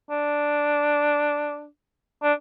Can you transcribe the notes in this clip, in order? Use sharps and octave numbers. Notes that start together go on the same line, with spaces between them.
D4
D4